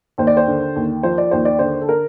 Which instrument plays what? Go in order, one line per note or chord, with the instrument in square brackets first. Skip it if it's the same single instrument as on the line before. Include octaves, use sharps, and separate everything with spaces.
[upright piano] D#2 C5
D5
C5
D3
D#2
F3 C5
D5
D#2 C5
D5
D3 C5
A4
A#4